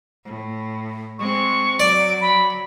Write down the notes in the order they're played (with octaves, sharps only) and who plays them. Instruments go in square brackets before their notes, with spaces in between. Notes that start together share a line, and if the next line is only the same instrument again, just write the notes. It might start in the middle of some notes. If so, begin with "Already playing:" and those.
[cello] A2
[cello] G#3 C4 [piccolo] C#6
[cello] F#3 [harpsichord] D5 [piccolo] D7
[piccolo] B5